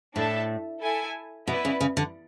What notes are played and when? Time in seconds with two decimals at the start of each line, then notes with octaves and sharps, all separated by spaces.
0.15 A2 D4 A4 E5 A5
0.82 E4 A4 E5 G#5
1.47 B2 B3 E4 B4 D5
1.65 C#3
1.81 C#3
1.97 D3